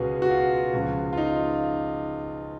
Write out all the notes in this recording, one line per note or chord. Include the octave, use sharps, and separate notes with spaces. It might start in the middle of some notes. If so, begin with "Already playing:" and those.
Already playing: C#2 B2 B3 C#4 F4 F#4 G#4
F#4
F4
C#2 C#3 F3
F4
D#4